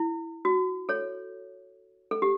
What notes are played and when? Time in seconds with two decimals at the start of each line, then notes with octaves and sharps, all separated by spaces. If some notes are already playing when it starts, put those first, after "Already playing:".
Already playing: E4
0.45 F#4
0.89 A4 C#5
2.11 A4
2.22 G4